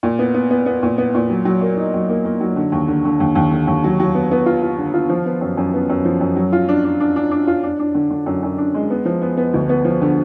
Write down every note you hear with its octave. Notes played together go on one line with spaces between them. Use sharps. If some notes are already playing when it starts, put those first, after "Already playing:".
A#2
B3
B3
B3
B3
A#2
B3
A#2
F#3
F#3
A#3
D#4
F#3
A#3
A#3
F#3
D3
D#2
D3
D3
D#2
D#2
D3
D#2
F#3
F#3
B3
B3
F4
F4
D3
F4
F3
B3
F#2
F#2
B3
F#2
F3
F#2
F#3
F4
D4
D4
D4
D4
D4
F4
D4
D4
D3
D3
F#2
F#2
D4
G#3
B3
F3
B3
B3
D2
B3
F3
D3